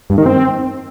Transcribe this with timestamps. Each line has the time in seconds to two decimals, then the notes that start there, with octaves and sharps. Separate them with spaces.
0.10 G2
0.18 D#3
0.26 C4